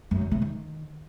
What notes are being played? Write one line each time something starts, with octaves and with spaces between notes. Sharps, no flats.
F#2
D3
C3
D#3